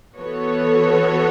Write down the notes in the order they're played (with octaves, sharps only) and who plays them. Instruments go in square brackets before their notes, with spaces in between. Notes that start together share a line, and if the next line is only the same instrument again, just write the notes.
[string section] E3 B3 F#4 A4 C#5